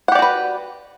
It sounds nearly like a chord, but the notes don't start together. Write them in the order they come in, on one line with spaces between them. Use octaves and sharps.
F#5 G4 D5 F#4 B4